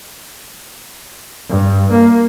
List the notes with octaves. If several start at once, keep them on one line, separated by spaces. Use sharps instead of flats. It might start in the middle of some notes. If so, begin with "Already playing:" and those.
G2
A#3